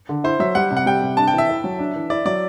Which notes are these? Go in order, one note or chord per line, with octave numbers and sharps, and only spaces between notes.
D3
E4 C5
F#3 E5
G3 F#5
C3
F#5
G3 G5
C3
D4 A5
G5
E3 E5
E4
F#3
D4
E3
E4 D5
F#3 D5